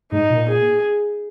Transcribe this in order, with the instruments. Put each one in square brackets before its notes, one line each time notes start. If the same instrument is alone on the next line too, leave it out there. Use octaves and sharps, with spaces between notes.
[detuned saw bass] G#2 [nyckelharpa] D#4
[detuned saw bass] A#2
[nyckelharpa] G#4